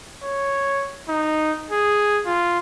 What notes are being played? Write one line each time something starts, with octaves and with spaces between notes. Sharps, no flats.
C#5
D#4
G#4
F4